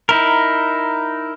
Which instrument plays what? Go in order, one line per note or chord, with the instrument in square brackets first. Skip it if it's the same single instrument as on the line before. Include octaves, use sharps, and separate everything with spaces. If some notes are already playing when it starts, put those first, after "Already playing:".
[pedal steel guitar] D#4 E4 A#4